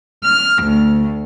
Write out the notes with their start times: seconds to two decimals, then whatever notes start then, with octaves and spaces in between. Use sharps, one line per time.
0.24 F6
0.62 D2